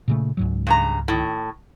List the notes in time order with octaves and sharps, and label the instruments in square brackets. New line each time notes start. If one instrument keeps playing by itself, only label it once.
[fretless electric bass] A#2 C#3 A3
C#2 G#2 F#3
[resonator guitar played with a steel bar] G2 C#3 A#5
A2 D#3